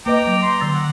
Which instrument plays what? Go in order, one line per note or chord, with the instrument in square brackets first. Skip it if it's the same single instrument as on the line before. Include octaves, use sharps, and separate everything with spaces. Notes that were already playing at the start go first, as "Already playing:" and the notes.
[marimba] A#3 B4 D#5 [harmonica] G5 A#5 D6
[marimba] F#3
[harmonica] A#5 C6
[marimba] D3 E6 A6
[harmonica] F#5